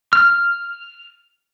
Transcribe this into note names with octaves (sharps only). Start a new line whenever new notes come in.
F6